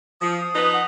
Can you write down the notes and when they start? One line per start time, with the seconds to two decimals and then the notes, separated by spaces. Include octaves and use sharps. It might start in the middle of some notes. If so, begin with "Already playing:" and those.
0.21 F3 D#6
0.55 F3 D#4 B4
0.73 F#5